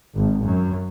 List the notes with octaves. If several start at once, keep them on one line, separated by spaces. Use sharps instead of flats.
G#1
F#2